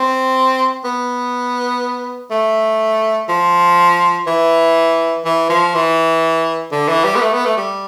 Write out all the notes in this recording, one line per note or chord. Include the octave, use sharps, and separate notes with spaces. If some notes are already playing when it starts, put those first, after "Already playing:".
Already playing: C4
B3
A3
F3
E3
E3
F3
E3
D3
E3
G3
B3
A3
B3
A3
G3